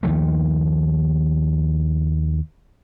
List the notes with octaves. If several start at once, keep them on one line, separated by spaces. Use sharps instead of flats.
D#2 D#3 F3 A3